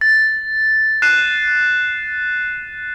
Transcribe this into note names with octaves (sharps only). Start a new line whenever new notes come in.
A6
F#6 C7 D#7 E7